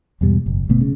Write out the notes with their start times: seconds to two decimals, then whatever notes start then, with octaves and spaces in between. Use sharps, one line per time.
0.21 E2 G#2 B2 G3
0.46 F#1
0.69 G1 B2 A3 B3
0.81 C#3